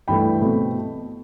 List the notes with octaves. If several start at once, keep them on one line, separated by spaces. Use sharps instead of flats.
G2 E3 A3 G5 B5
B2 A3 C4